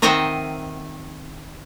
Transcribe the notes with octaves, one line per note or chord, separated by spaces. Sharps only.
D#3 C4 A#4 D#5 E5 F#5